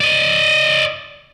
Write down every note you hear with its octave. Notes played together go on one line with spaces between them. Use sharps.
D5 D#5